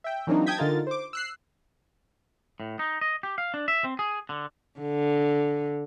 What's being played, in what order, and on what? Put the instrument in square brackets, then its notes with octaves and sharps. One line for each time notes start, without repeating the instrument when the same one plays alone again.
[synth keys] E5 G5
E3 F#3 A#3 C4 D4 D#4
G5 A5 D#6 G6 G#6 B6
D3 D#4 F4 A#4 A6
C5 D6
E6 F#6 C7
[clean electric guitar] A2
D#4
D#5
G4
F5
D4
E5
C4
G#4
D3
[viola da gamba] D3